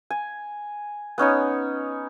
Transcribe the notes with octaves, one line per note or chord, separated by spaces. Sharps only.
G#5
B3 C#4 D#4 C#5